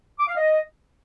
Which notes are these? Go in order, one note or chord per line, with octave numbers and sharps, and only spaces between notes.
D6
F5
D#5